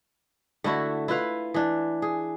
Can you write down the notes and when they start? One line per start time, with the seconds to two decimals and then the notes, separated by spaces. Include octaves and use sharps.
0.64 D3 A3 E4 F#4
1.08 E4 F4 B4 F5
1.54 E3 D4
2.02 G#4